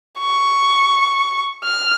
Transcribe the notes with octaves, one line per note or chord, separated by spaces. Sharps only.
C#6
F6